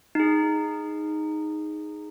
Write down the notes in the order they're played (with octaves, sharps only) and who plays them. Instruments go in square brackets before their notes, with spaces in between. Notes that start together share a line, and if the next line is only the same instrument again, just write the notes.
[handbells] D#4 G#4